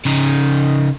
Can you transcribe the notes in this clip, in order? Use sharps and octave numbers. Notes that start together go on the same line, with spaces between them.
C#3 D#4